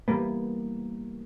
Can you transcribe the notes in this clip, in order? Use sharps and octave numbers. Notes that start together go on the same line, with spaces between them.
E3 G3 A#3 B3